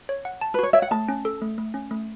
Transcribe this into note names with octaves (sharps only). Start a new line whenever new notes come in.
C#5
F#5
A5
B4
F#4 C#5
C#5 E5
F#5
A3 A5
C#4
A4
A3
A3
C#4
A3